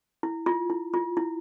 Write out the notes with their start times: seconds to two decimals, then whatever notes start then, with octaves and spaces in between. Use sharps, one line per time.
0.23 E4
0.46 F4
0.70 E4
0.94 F4
1.17 E4